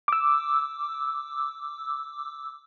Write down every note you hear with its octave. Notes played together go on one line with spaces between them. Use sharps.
D6 E6